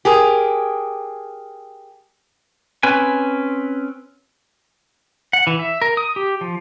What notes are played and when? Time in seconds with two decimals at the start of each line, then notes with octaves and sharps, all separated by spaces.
0.05 G4 G#4 A#4
2.83 C4 C#4 B4 G#5
5.33 F#5
5.47 E3
5.59 E5
5.82 A#4
5.97 D#6
6.16 G4
6.41 F3